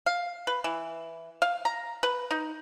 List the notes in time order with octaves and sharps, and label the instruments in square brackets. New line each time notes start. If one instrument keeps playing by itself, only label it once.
[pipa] F5
B4
E3
F5
A#5
B4
D#4